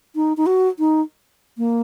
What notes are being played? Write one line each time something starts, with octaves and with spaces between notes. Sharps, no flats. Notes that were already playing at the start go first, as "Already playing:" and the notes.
D#4
D#4
F#4
D#4
A#3